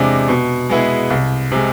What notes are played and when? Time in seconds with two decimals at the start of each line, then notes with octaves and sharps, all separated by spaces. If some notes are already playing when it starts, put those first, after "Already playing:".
Already playing: E2 C3 G#3 D4
0.28 B2
0.70 G#3 B3 E4 G#4
1.10 C2
1.52 C3 G#3